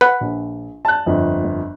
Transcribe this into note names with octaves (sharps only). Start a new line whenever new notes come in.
B4 F#5
A#1
A5 F#6
G1 F2